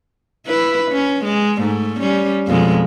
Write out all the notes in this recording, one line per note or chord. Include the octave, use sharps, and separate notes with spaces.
E4 B4
C#4
G#3
G#2 A3
G3 C#4
F2 B2 G#3